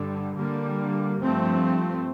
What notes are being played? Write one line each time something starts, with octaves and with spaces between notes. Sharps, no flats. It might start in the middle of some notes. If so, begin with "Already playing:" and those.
Already playing: G2 D3 G3
D3 G3 A#3
G2 F3 A3 C4